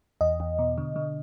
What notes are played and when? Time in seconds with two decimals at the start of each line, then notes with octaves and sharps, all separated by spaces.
0.21 E2 D#5
0.40 E2
0.59 B2
0.78 D3
0.96 D3